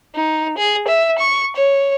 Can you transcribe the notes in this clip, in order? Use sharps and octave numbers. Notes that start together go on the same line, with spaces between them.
D#4
G#4
E5
C#6
C#5